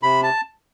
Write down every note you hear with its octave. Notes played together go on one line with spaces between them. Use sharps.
C3 B5
A5